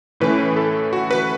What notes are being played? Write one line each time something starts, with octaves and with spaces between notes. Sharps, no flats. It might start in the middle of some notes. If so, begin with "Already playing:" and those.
A2 E3 A3 C#4 B4
A4
F#4
B4